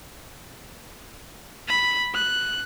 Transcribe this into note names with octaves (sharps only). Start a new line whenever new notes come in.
B5
F#6